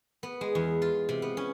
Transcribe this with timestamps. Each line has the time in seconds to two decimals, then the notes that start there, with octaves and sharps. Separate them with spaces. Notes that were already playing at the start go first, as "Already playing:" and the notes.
0.23 B3
0.41 G#3
0.55 E2
0.82 F4
1.09 C3
1.22 B3
1.37 C#4